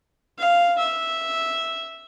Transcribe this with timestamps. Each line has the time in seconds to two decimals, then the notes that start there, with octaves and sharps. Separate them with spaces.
0.39 F5
0.78 E5